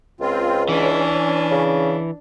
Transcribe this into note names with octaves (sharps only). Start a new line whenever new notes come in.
C#2 C4 F4
E3 C#4 D4
C#3